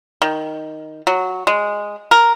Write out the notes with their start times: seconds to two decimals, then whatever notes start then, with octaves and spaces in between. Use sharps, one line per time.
0.22 D#3
1.07 F#3
1.47 G#3
2.11 A#4